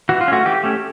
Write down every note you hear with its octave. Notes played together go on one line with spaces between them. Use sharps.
E3 F#4
F4
A3 C#4 F#4
E3 G4
A3 C#4